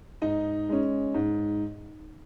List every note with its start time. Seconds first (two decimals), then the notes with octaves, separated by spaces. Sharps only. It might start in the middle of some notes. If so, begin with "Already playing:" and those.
0.22 G#2 D#4 D#5
0.69 G#3 C#4
1.14 G#2